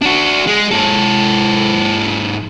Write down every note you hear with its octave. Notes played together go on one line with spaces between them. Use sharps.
D4 F#4
G#3
G#2 A4